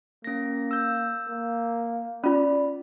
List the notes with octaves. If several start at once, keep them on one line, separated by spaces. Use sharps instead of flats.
A#3 C#4 A#6
E6 G6
A#3
C#4 F4 D5 B5